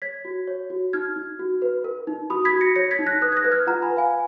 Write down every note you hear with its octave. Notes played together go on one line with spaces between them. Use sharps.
C#5 G#6 B6
F#4
C#5
F#4
D#4 F6 G#6
D#4
F#4
B4
A#4
D#4
F#4 B5 D#6
G#6 B6
F#4
A#6 C#7
C#5 A#6 C#7
G#6 B6
D#4
F#6 A#6
B4 D#6 F#6
G#6
F#6 A#6
B4
F6 G#6
F4 F#5 A#5
G#5 B5
B4
F5 G#5